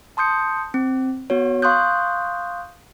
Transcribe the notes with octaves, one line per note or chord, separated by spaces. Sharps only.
A5 C6 D#6 G6 C#7
C4
B3 F#4 C#5
F5 C6 C#6 D#6 F#6 G6